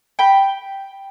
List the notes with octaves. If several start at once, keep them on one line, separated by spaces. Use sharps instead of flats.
G5 B5